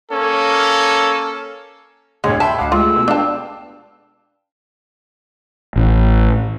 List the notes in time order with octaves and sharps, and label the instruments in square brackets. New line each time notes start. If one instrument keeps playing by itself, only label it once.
[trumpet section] A#3 C#4 A4
[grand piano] D2 A2 [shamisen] G#3 [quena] C#5
[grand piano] E5 G5 C6 [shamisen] A5 [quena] B5
[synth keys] D2 D#5 F#5 [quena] F5 [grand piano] D6
[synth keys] G#3 A3 G4 [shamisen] F4 [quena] E6
[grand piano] B2
[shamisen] D4 A5 [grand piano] B4 F5 G5
[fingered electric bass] A1